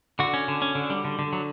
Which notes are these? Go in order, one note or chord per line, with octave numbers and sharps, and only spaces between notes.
D3 F#4
C#4
D3
C#4
D3
G3
D3
D3
F#3